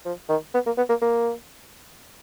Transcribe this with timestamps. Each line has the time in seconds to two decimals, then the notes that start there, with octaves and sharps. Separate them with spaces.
0.05 F3
0.29 D#3
0.54 B3
0.66 A#3
0.77 B3
0.89 A#3
1.02 A#3